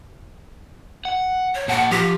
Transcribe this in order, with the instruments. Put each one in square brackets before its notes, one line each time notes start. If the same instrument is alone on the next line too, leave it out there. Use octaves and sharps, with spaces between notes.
[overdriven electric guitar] F#5
[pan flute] C#5
[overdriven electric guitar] A#2 A5 [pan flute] F#5
[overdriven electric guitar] F3 [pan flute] G4